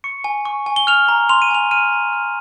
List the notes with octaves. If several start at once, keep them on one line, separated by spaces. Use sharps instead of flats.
C#6 C#7
G#5
C#6
G#5
G7
F6 F7
A#5
C6 F7
D#7
G#5 F7
F6 D#7
A#5
F6